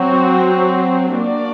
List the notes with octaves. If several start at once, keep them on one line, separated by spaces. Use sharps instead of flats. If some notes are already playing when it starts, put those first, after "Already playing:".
Already playing: F#3 C4 F#4
A#3 D4 F#4 A#4 D5